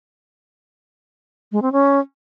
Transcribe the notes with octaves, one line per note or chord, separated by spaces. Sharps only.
G#3
C4
C#4